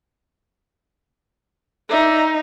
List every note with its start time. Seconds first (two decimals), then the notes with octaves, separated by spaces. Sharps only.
1.89 D#4 D5 E5